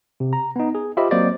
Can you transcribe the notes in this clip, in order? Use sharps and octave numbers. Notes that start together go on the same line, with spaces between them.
C3
A#5
B3 D#4
G#4
F4 G4 C5 D#5 E5 B5
F#3 A#3 C4 C5 D5 D#5